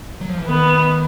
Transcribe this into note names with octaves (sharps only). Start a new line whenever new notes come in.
F#3
F3
E3
D#3 B3